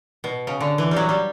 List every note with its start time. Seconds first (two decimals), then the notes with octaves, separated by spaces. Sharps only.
0.24 B2
0.47 C#3
0.60 D3
0.78 E3
0.91 G3
0.96 F#3
1.09 G3